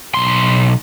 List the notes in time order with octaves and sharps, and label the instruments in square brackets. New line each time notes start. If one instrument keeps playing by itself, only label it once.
[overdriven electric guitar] B1 C6